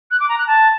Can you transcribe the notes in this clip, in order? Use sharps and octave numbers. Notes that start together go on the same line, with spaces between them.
F#6
D6
A#5
F#6
A5